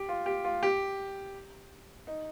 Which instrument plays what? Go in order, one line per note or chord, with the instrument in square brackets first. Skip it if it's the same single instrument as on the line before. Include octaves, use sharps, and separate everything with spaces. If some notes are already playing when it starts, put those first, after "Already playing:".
Already playing: [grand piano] G4
F4
G4
F4
G4
D#4